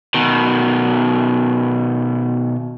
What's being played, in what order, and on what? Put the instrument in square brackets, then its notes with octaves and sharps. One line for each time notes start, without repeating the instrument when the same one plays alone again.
[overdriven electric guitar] B2 D#3